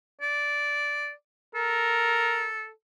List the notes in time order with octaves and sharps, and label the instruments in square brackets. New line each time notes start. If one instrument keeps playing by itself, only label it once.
[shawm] D5
[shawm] A4 [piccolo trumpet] A#4